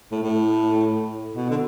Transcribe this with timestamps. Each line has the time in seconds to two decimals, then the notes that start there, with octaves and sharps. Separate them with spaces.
0.12 A2
0.23 A2
1.35 B2
1.50 D3